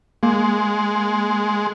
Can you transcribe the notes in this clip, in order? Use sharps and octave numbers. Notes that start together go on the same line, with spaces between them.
G#3 A#3